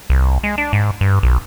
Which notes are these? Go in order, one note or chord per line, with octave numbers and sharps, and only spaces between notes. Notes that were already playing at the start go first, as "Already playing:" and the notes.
C2
G#3
D4
G#2
G2
B1